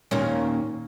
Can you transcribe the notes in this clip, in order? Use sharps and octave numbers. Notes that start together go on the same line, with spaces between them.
D#2 A#2 C#4